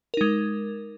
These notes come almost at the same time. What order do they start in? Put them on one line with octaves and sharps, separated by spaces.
A#4 D#4 G#3